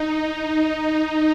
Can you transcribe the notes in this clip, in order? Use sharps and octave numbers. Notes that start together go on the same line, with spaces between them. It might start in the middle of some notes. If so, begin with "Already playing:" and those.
Already playing: D#4